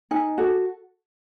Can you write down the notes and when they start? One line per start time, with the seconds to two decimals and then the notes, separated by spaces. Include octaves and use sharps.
0.11 D#4 G#5
0.38 F#4 A4